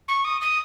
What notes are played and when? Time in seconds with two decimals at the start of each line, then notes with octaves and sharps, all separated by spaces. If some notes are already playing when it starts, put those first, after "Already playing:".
0.08 C#6
0.24 D#6
0.41 D#6